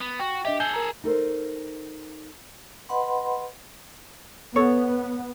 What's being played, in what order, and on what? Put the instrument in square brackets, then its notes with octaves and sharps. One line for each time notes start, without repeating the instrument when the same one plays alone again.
[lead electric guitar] B3
[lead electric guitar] F#4 [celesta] G5
[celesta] D4 D#5 E5 [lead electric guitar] G4
[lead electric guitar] G#4 A4 [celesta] G#5 G6 G7
[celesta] A#4 A#5
[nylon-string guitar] D#4 A4 A#4 C5
[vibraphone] B4 D#5 F#5 B5 C6
[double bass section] B3 [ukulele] A4 C#5